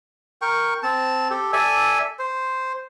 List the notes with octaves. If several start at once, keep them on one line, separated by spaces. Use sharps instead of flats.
A#4 G5 C#6
C4 A5
G4 A4
A4 D5 E5 G#5
C5